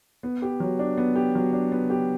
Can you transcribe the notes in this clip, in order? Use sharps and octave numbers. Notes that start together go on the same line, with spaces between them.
B3
G4
F#3
D4
B3
G4
F#3
D4
B3
G4